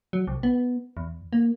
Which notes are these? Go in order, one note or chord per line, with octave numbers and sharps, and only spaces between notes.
F#3
C2
B3
E2
A#3